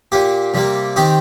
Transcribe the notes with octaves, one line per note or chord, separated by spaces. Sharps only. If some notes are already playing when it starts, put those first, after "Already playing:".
A#2 A#3 G4
C3 G3 A#3
D#3 C4 D#4 G4